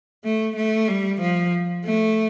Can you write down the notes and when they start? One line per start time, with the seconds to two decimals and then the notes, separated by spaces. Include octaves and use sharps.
0.24 A3
0.56 A3
0.88 G3
1.21 F3
1.85 A3